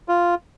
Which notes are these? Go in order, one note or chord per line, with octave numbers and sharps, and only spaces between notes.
F4